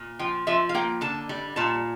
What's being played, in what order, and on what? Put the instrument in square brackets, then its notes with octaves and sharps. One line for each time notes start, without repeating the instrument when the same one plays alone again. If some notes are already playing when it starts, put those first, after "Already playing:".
Already playing: [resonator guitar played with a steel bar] A#2
F3 G5
F3 E5
F5
A#3 G5
D3 A5
G3
A#2 A5